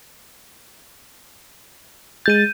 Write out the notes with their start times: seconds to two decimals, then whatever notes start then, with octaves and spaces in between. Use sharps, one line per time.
2.26 G#3 G6 A6 D#7